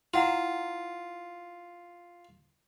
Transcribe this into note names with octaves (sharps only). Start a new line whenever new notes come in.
E4 F4 F#5 A#5